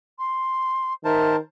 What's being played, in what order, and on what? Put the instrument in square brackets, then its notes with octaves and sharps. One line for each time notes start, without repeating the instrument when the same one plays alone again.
[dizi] C6
[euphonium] D#3 [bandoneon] A#4 C5 A5 [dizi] E5